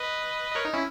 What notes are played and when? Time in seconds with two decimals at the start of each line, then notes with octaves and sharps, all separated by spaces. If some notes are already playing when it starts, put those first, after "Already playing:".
Already playing: B4 D#5
0.52 D#5
0.55 A#4 C#5
0.65 D#4
0.73 C#4 E4